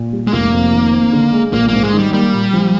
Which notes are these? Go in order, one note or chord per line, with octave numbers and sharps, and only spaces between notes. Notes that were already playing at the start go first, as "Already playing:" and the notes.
Already playing: A#2
G3
G#3
F1 A#3
F2
D#3
C4
D3
G#3
A#1 A#3
G#2 A#3
G#3
D#3
G3
G3 A#3
A#2
F3